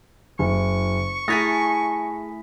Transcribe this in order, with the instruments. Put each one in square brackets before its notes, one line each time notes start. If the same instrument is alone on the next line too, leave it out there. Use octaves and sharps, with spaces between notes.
[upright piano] F#1 [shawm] C#6
[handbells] A3 E4 B6 [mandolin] G#4 G#5 A5 [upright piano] A#6